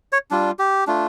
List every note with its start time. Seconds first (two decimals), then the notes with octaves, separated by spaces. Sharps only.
0.12 C#5
0.31 G3 D4 F4
0.59 G4
0.87 A3 D4 F4